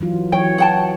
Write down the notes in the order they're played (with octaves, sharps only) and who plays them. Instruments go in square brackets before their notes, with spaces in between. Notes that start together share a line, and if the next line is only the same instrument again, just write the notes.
[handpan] E3 F#3 F4
[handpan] E3 F#3 C#5 [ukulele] G5
[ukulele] F#5 G5 A5